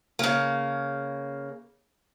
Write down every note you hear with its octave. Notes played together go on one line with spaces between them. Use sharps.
C#3 A#3